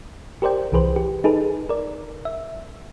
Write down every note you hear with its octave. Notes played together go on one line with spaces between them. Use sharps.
G4 A#4 C5 D5 G5
C2 E3 G#4 B4 C5
G4
D#4 G#4 A4 B4
A#4 D5
E5